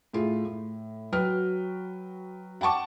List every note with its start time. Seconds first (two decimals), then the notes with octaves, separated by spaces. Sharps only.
0.13 A2 F4 G#4
0.45 A2
1.12 F#3 F#4 B4 G5 F6
2.61 F#5 G5 A5 C#6 D6